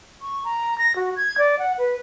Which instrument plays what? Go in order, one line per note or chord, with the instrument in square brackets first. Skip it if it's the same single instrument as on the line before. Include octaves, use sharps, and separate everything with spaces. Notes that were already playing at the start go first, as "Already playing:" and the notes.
[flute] C#6
A#5
A#6
F#4
G#6
D5
F#5
B4